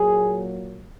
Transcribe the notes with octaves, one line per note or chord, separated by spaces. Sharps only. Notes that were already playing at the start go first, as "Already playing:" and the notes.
Already playing: A#2 F#3 A#3 G#4